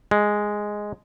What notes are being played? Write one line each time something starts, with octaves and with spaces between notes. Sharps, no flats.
G#3